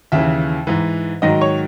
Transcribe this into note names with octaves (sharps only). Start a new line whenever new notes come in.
D#2 C#3 E3 E5
G#2 E3
G#2 D#3 F#3 D#5
C#5